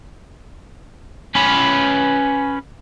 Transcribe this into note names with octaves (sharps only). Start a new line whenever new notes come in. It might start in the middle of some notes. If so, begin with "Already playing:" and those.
C#4 B4